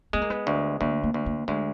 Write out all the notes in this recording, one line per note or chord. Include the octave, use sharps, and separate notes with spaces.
G#3 B3
A#3
B3
D2
D2 A#3
A#3
D2
A#3
D2 G#3